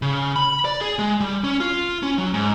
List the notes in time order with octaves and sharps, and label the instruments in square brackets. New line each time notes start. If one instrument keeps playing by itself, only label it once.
[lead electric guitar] C#3
B5
D5
G#4
G#3
G3
C#4
F4
C#4
F#3
G#2